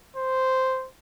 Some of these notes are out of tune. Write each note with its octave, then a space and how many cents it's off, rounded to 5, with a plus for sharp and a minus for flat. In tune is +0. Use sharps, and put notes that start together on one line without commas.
C5 -5